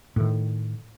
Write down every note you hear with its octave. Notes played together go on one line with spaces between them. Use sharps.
A2 D#3